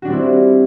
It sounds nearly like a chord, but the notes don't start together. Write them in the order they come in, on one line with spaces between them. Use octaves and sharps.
F#4 D4 G3 C4 E4